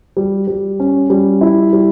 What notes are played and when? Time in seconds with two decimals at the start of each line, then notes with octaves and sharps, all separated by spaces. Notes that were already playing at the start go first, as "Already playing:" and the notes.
0.17 G3
0.47 G3
0.80 C#4
1.10 G3
1.41 E4
1.73 G3